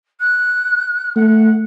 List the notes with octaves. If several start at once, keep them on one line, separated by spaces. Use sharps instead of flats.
F#6
A3 F#5